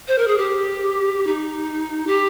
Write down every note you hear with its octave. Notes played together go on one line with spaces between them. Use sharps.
C5
A#4
G#4
G4
D#4
G4